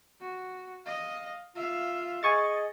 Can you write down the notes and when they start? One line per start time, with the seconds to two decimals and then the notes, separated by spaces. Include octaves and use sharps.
0.21 F#4
0.86 D#5 F5
1.55 F4 E5 F5
2.23 G#4 D#5 G#5 C#6 A6